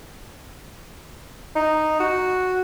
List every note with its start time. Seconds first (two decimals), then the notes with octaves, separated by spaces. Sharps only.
1.55 D#4
2.00 F#4